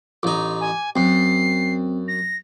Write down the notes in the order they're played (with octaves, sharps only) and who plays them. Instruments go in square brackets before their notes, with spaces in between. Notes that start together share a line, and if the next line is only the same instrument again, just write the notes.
[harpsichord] A1 D#4 [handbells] D6
[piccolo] G#5
[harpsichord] F#2 [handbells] C4 [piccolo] C7
[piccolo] A#6